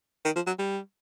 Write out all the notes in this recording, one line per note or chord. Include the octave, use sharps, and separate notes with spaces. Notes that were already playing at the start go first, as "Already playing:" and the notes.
D#3
F3
F#3
G3